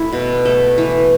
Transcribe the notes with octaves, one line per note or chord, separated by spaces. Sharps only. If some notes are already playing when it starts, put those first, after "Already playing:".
Already playing: A3 E4
B2
A3
E3